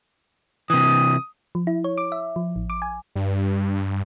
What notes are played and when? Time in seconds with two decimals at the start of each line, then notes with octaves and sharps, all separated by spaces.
0.70 C3 E3 D#6
1.55 F3
1.67 E4
1.84 C#5
1.98 D6
2.12 E5
2.36 F3
2.56 A1
2.70 D6
2.82 G#5
3.15 G2